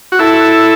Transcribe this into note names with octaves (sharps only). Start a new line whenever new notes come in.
F#4
E4 A4